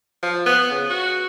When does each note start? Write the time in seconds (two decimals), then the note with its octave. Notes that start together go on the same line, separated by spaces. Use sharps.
0.23 F3
0.46 B3
0.70 C#3
0.90 F#4